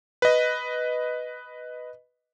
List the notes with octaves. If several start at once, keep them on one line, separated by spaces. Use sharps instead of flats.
B4 D#5